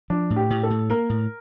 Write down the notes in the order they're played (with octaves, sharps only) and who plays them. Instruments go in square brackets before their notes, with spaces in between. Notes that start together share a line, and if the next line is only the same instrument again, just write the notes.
[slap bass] F3 [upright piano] D4
[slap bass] A2
[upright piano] G4
[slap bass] A2
[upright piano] A4
[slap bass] A2
[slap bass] A#3 [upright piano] A#4
[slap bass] A2